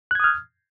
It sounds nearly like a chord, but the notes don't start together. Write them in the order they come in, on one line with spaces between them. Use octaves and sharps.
F#6 G#6 D#6 F6